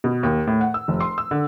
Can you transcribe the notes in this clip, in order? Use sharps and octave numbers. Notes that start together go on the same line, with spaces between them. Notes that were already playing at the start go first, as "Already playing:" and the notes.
B2
D#2
A2
F#5
E6
F1
C6
E6
D3